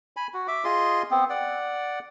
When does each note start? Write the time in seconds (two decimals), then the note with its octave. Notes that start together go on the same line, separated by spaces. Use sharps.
0.17 G#5 B5
0.34 F#4
0.48 E5 D6
0.65 F4 G#4 D#5 C6
1.11 B3 C4
1.30 D5 F#5